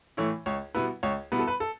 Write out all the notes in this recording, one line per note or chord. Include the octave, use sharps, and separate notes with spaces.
A2 E3 A3 E4 C#5
C#2 C#5
B2 G3 B3 E4 B4
C#2 C#5
B2 G3 B3 E4 B4
A4
B4
A4